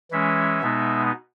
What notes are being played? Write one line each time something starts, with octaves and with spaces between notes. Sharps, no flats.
E3 G#3 C#4 E5
B2 G#3 B3 D#4